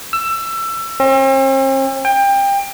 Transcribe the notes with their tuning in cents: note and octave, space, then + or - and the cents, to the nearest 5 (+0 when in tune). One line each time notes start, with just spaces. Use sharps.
E6 +20
C4 +45
G5 +25